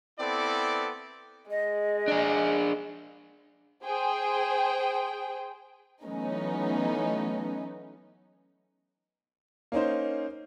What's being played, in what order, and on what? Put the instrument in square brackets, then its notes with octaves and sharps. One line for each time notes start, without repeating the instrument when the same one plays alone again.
[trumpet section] B3 C4 E4 A4 D5 D6
[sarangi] G#3 [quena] D#5
[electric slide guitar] D4 G#4
[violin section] G#4 C5 G5
[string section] E3 F#3 A3 B3 C#4 D#4
[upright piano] A#3 C#4 D#4 C5